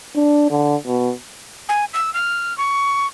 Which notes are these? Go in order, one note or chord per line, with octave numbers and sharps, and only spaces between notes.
D4
D3
B2
G#5
E6
F6
C#6